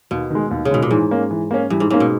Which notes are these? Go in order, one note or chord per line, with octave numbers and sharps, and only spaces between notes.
D#2 B2
D#3 G#3
D#2
C#3
B2 D#3 G#3
A#2
G#2 E3
A#3 C#4
E3
A#3 C#4
G2 E3
G#2
G#2 A#3 C#4
B2